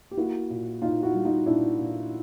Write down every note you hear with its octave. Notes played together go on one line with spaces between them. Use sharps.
G4
A#3 E4 F#4
A#2
A#2 D#4 F4
E4 F#4
G3
D#4 F4
A#2 D4 E4
A#2